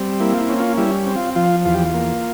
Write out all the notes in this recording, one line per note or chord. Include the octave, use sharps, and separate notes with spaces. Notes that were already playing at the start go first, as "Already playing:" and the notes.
Already playing: G3 C4
A#3 E4
F4
E4
C#4
F4
G3 E4
C4
F4
F3 F4
E2 F4
G4
F4
A#3